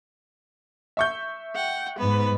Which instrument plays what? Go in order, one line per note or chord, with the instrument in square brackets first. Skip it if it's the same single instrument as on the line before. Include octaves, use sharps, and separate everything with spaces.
[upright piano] E5 C#6 G6
[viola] F#5 G5
[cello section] G#2 [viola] B3 B4